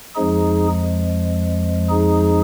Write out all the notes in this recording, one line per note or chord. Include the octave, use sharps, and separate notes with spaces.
F2 F3 G#3 D#4 G#4
D#4 G#4